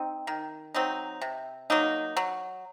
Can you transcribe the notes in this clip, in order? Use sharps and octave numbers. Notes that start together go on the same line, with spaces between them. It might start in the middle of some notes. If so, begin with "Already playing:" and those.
Already playing: C4 D#4
D#3
F#3 C4 D#4
C3
F#3 A#3 D#4
F#3